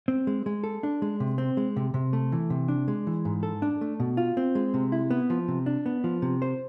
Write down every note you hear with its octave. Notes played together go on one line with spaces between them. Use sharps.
C4
G#3
G#3
A4
D4
G#3
C3
C4
G#3
C3
C3
A3
E3
C3
D4
G#3
E3
G#2
A4
D4
A3
B2
F4
C4
G#3
C3
E4
B3
F3
C3
D4
B3
F3
C3
C5